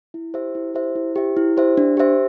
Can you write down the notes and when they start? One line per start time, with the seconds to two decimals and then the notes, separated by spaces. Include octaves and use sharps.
0.14 E4
0.34 G4 C5 E5
0.55 E4
0.74 G4 C5 E5
0.95 E4
1.16 G4 C5 E5
1.37 E4
1.57 G4 C5 E5
1.77 D4
1.97 G4 C5 E5